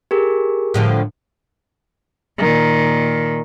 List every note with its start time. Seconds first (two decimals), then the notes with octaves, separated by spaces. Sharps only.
0.11 G4 G#4 A#4
0.74 A2 D3 F3
2.38 A#2 D#3